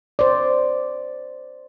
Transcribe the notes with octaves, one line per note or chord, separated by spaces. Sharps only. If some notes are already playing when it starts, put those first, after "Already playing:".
C5 D5